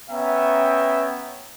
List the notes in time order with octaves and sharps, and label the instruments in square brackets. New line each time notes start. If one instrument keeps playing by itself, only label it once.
[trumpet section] B3 C#4 E5 G5 A#5